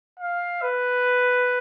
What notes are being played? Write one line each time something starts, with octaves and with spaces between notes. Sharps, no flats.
F5
B4